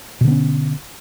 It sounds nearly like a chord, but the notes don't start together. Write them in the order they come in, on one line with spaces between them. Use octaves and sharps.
B2 D3 B3 C#4